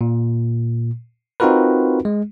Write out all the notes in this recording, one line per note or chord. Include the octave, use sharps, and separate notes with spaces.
A#2
C4 D#4 F4 F#4 A#4 B4
G#3